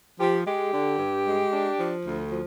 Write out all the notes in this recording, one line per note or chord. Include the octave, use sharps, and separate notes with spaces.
F3 G4
G#3 G4
D3
G2
G#3
D4
F3
D2
F3